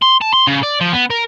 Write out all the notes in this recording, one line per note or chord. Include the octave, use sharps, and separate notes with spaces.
C6
A5
C6
C#3
D5
F3
B3
A#4